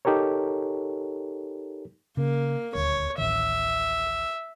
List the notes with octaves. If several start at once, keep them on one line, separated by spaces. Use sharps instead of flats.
D#4 G4 A4 A#4 C#5
C#3 A#3
D#1 D2 C#5
D1 A1 D#3 E5